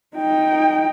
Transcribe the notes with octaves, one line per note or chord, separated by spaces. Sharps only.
D#4 G5